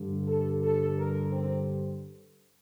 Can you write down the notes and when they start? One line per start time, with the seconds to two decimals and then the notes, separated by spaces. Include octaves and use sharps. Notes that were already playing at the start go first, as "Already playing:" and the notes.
Already playing: G2 D3
0.26 A4
0.62 A4
0.97 A#4
1.31 C4